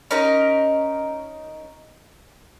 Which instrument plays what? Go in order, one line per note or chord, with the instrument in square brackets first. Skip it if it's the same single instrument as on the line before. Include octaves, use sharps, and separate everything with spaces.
[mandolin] C#4 D#4 A#4 D#5